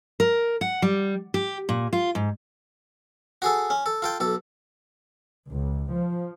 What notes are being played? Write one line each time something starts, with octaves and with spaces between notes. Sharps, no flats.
A#4
F#5
G3
G4
A#2
F4
G#2
F#4 G#4 A4
C#4
A4
F4 A4 G5
B1 A4
C#2
F3